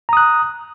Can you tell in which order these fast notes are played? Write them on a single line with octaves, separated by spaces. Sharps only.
A#5 D#6 F#6